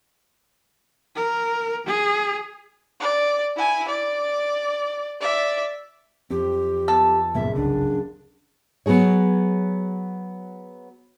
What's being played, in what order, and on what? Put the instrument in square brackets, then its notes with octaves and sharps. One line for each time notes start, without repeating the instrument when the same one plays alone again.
[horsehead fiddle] A#4
G#4
[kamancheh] D5
E4 G#5
D5
D5 E5
[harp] F2 [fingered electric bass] C4 [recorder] G4
[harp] B3 F4 A6 [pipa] A4
[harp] F#1 C#2 A6 [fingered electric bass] G2 A#2 B3 [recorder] E5
[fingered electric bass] G1 C2 C#3 [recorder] D4 [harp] F#5 D#6
[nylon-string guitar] F#3 B3 F#4 G#4 C#5